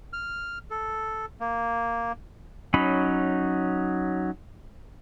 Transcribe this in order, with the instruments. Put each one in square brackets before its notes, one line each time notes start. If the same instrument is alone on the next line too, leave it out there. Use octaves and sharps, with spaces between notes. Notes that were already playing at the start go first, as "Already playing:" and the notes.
[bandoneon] F6
A4
A#3
[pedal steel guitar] F#3 C#4 D#4 B5